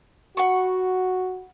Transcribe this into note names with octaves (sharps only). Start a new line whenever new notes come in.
F#4 F#5 B5 C#6